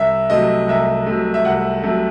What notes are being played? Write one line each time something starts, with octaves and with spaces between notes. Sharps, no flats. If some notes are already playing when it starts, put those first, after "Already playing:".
Already playing: C2 E5
C3 F#3 A3 D#5
C2 E5
C3 F#3 A3
E5
C2 F#5
C3 F#3 A3